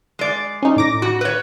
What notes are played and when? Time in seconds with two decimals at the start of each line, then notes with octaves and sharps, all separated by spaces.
0.19 G#3 D5
0.63 C#4 D#4
0.76 A2 D6 A#6
1.02 F#4
1.21 B4 C#5